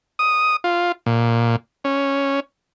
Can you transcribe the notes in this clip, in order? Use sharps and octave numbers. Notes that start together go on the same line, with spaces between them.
D#6
F4
A#2
C#4